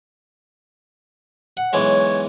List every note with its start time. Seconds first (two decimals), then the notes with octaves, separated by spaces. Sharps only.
1.57 F#5
1.73 B1 E3 G#3 C#5